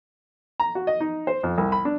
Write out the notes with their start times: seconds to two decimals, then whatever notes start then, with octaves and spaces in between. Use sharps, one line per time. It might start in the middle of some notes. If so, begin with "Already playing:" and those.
0.60 A#5
0.75 F#4
0.87 D#5
1.00 D#4
1.27 C5
1.43 F2
1.58 C2
1.72 B5
1.85 D4